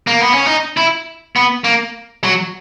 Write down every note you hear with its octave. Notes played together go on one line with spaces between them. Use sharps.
A#3
B3
C#4
D#4
E4
B3
A#3
F#3